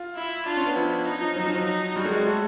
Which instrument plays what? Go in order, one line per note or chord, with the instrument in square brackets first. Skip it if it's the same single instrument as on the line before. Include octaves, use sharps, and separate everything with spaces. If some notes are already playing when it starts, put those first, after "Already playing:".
Already playing: [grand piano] F4
[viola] E4
[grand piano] D4 [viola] F4
[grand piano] C#4
B3
[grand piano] F3 [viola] E4
[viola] D#4
[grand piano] F3
F#3
F3
F#3
[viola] D#4
[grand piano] G3 [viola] F#4
[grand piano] G#3
G#3
A3